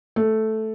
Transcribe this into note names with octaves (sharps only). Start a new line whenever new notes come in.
A3